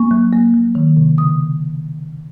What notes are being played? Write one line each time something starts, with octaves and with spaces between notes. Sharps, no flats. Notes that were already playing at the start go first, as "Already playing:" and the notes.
Already playing: A#3 C#6
F#3
A#3
F#3
D#3
C3
C#3 D#6